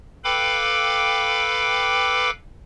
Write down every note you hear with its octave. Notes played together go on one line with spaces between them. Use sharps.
A4 B4 F5 G5 B5 D6